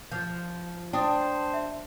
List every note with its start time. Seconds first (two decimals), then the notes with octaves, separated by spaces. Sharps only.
0.12 F3 G6
0.93 D4 C5 G5 D#6
1.53 E5